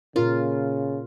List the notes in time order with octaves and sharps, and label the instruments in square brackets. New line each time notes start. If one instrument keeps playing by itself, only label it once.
[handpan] A#2 A#4 [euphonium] C#3 [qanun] F4